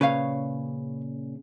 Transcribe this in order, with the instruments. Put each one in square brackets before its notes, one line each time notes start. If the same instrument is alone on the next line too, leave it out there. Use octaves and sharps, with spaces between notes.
[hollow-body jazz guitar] A#2 C#3 [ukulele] B4 C#5 F5